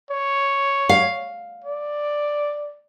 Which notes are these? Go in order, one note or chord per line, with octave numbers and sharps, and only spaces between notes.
C#5
F5
D5